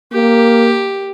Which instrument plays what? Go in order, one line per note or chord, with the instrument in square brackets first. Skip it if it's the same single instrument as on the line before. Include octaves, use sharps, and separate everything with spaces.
[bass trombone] A#3 [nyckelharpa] G4